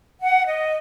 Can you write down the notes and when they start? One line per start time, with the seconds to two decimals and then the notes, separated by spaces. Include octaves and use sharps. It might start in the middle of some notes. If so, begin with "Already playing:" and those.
0.21 F#5
0.46 D#5